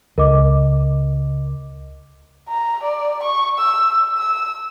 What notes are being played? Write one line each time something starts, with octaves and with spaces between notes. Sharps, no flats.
C#2 A#4 D#5 D6
A#5
D5
C#6
E6
E6